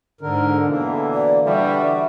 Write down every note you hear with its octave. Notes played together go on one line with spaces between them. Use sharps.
G#2 D3 A#4
B2 D3 E3 A#3
D5
D3 E3 G3 F#4 E5